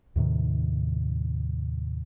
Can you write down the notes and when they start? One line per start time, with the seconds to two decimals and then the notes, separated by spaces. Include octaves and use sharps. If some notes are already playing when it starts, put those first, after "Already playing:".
0.16 D#2 A2 C3 D#3